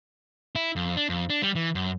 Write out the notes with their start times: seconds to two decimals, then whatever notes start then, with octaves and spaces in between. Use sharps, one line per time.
0.55 E4
0.76 F2
0.97 D4
1.09 F2
1.30 D4
1.42 G3
1.55 E3
1.75 F#2